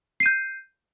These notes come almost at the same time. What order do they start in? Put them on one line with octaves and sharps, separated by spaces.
C7 D#7 G6